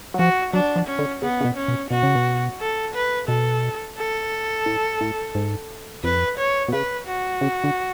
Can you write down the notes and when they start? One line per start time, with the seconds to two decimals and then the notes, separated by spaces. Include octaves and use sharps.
0.14 F#3
0.18 F3 F#4
0.53 F#3 D4
0.76 F3
0.87 C#4
0.99 D3
1.22 C#3 B3
1.41 C#3
1.45 B2
1.57 C#4
1.68 B2
1.90 B2 F#4
2.03 C#3
2.15 B2
2.60 A4
2.94 B4
3.28 B2 A4
3.97 A4
4.66 A2
5.01 A2
5.35 G#2
6.04 F2 B4
6.38 C#5
6.68 B2
6.73 C#3 B4
7.07 F#4
7.41 C#3
7.64 D3